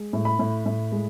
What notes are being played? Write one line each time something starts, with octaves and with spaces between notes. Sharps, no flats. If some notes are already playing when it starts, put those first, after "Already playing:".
Already playing: G#3
A2
B5
A2
A2
G#3